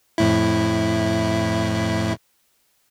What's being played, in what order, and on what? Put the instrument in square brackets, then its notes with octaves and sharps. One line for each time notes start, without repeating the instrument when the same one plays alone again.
[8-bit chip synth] F2 A2 E4